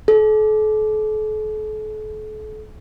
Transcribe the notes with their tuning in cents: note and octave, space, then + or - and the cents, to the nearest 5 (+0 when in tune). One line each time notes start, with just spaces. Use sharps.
A4 -40